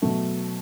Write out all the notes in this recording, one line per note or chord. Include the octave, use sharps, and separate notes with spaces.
B2 F#3 A3